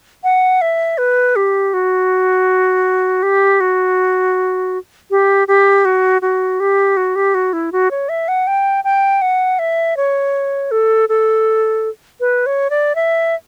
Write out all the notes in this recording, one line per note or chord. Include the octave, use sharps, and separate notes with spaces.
F#5
E5
B4
G4
F#4
G4
F#4
G4
G4
F#4
F#4
G4
F#4
G4
F#4
E4
F#4
C#5
E5
F#5
G5
G5
F#5
E5
C#5
A4
A4
B4
C#5
D5
E5